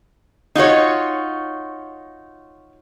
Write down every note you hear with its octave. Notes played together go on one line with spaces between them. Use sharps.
D#4 F4 F#4 C#5